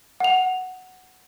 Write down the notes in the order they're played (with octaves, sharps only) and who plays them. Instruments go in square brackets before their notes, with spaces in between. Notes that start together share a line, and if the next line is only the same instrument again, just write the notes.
[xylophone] F#5 F7